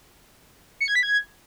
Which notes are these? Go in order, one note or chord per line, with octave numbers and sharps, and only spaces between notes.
C#7
G#6
B6
G#6